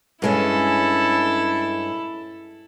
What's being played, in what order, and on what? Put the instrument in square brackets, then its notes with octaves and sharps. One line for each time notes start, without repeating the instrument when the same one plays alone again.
[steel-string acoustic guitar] G2 G#3 C#4 [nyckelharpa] E4 A4